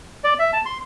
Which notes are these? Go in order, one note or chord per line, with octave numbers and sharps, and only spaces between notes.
D5
E5
A5
C6